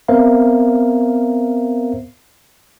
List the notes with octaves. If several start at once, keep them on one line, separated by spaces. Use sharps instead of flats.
B3 C4 A#4 C5 E5 F5